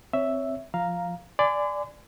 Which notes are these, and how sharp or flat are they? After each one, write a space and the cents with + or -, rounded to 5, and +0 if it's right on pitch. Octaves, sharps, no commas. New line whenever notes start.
C4 +0 C#5 +15 E5 +0
F3 +0 F5 +0 A#5 +0
D5 +0 G#5 +0 C6 -45